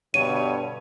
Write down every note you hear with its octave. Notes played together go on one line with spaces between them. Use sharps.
G2 B2 D3 C#5 D#7